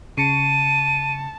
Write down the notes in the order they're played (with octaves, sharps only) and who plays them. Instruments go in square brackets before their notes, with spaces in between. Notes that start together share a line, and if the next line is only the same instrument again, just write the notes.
[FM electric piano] C#3 C#7 [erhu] A5 [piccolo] D#7